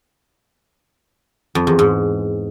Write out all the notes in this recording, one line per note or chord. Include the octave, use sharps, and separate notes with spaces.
F2
E2
G#2